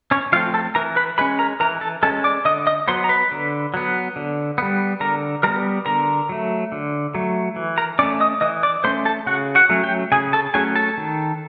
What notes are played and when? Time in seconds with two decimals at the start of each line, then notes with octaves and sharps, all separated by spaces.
0.11 C#4 C#5
0.32 F3 A3 C4 F4 F5
0.54 A4 A5
0.75 E3 A#4 A#5
0.96 B4 B5
1.18 G#3 C#4 B4 B5
1.39 A#4 A#5
1.60 E3 A#4 A#5
1.81 A4 A5
2.03 G#3 C#4 A4 A5
2.24 D5 D6
2.45 D3 D#5 D#6
2.67 D#5 D#6
2.88 F#3 B3 C5 C6
3.04 A#5
3.09 B4 B5
3.31 D3
3.74 F#3 B3
4.16 D3
4.58 G3 B3
5.00 D3 A#4 A#5
5.43 G3 B3 A#4 A#5
5.86 D3 A#4 A#5
6.29 F#3 A3
6.72 D3
7.14 F#3 A3
7.56 E3
7.78 A#4 A#5
7.99 C#4 D5 D6
8.03 A3
8.20 D#5 D#6
8.41 E3 D#5 D#6
8.63 D5 D6
8.84 A3 C#4 C5 C6
9.05 A4 A5
9.26 C#3 F#4 F#5
9.55 F#4 F#5
9.69 F#3 A3 C#4
9.83 G4 G5
10.12 C#3 G#4 G#5
10.33 A4 A5
10.54 F#3 A3 C#4 G#4 G#5
10.76 A4 A5
10.98 D#3